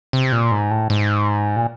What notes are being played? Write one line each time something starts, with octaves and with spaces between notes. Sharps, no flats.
C3
A#2
G#2
A2
G#2
A#2